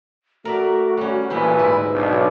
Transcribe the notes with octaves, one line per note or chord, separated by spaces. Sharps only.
A3 F#4 A#4 D5 E5
G3 C#4
D2 A#2 E3 B3 E4 B4 C5 G#5
G#2 E4
B1 D4